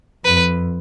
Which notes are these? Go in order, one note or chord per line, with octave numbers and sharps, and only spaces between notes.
F2 B4